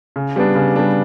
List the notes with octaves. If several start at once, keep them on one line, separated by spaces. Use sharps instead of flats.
C#3
G3 B3 D4
C#3
G3 B3 D4